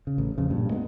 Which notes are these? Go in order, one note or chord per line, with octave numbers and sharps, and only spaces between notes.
C#3
A1
F2 C#3
G2 A#2
G#3 A#3 B3